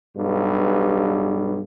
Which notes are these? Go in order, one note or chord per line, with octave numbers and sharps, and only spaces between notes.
B1 G2